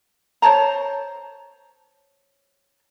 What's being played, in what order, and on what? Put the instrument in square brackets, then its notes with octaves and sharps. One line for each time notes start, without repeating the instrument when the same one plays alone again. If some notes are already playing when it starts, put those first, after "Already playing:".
[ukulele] C5 C#5 A5 A#5